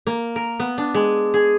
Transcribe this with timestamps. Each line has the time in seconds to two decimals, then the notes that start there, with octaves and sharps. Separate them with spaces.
0.07 A#3
0.36 A#4
0.60 B3
0.78 D4
0.94 G#3
1.34 G#4